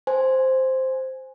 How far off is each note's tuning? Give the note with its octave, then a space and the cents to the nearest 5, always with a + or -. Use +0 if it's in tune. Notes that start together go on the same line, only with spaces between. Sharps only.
C5 +0 G#5 +0